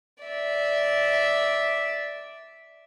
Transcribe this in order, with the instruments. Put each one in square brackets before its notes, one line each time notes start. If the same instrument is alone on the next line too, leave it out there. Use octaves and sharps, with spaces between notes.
[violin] D5 E5